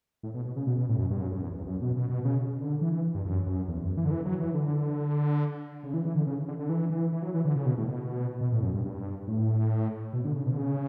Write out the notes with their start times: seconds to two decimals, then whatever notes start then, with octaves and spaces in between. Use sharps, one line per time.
0.23 A2
0.34 B2
0.45 B2
0.56 C#3
0.67 B2
0.78 B2
0.89 A2
0.99 F#2
1.10 G2
1.20 F#2
1.32 F#2
1.41 E2
1.53 E2
1.66 F#2
1.81 B2
1.96 B2
2.10 B2
2.25 C#3
2.61 D3
2.81 E3
2.93 E3
3.15 G2
3.25 F#2
3.46 F#2
3.68 E2
3.83 F#2
3.97 E3
4.05 D3
4.11 E3
4.25 F#3
4.40 E3
4.54 D3
5.83 C#3
5.94 E3
6.05 E3
6.15 D3
6.27 C#3
6.48 D3
6.59 D3
6.69 E3
6.90 E3
7.12 E3
7.22 F#3
7.34 E3
7.45 D3
7.56 C#3
7.66 B2
7.77 A2
7.88 B2
8.41 B2
8.52 A2
8.63 F#2
8.74 G2
8.85 G2
9.28 A2
10.13 B2
10.24 D3
10.35 C#3
10.46 B2
10.53 D3
10.57 C#3